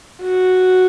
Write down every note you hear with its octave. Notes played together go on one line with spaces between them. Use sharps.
F#4